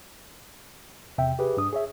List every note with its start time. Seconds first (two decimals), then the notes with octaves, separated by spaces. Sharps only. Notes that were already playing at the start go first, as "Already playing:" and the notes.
1.18 E2 C3 E5 G5
1.39 G4 G#4 B4
1.57 G2 D4 D#6
1.73 G#4 C#5 E5